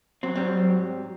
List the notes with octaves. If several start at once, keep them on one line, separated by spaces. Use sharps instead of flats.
F#3 C4
G#2 G3 C4